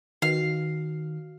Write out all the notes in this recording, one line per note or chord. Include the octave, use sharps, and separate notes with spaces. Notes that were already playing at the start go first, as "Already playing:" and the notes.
D#3 F#4 B4 F5